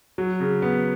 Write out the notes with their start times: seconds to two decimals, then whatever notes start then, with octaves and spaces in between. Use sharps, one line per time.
0.18 F#3
0.40 C#3
0.62 B3